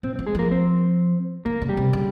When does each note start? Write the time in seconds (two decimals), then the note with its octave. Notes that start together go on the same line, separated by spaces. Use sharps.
0.03 A#2 C4
0.16 F3 C4
0.27 G#3 G#4
0.35 F3 A#3 A#4
0.51 C4 C5
1.45 D#3 A#3 A#4
1.62 C#3
1.69 G3 G4
1.77 C3
1.93 C#3